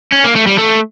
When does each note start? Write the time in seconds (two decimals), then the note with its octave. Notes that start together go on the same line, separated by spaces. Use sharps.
0.12 C#4
0.24 A#3
0.35 A3
0.47 G3
0.58 A3